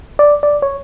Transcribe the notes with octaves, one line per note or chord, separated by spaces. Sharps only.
D5
D5
C#5